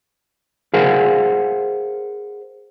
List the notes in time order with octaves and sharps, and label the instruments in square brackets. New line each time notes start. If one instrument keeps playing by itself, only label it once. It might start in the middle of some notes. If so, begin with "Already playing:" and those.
[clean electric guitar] G#4 A#4 C5 F5 F#5